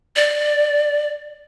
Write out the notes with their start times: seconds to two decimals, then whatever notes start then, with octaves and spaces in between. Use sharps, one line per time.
0.16 D5